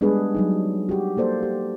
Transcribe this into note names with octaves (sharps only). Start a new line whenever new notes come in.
G3 G#3 B3 D4 G#4 B4
F#3 G3 D#4
F#4 G4
A#3 A4 C5 D5
G4